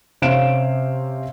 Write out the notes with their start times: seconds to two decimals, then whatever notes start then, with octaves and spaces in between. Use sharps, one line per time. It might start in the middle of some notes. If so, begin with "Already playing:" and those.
0.22 C3 C#4 C5 F5 D7 E7